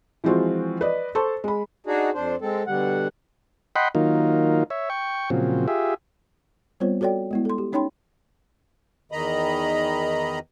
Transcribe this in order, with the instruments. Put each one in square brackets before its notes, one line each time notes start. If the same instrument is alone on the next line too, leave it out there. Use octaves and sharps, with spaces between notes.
[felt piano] E3 F3 G#3 C4 F4 F#4
B4 D5 D#5
A4 C5 A5 C6 C#6
G#3 B5
[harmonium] D4 D#4 F#4 G#4
F2 D4 C5
G#3 C4 A4
B2 D3 G3 F#5
[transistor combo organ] D#5 F#5 G5 B5 C6
D#3 F#3 A#3 D#4 F4
C#5 E5
G5 C#6
A#2 C#3 F3 F#3 C4
F4 G4 G#4 E5
[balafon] G3 B3 C4 F4 C5 C#5
F#4 A4 C#5 D5 G5
G#3 B3 E4
A4 C6
G4
C#4 D#4 C#5 G5 B5 C6
[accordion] E2 D#3 D#5 A#5 B5